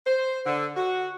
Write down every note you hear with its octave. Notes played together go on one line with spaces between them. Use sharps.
C5
D3
F#4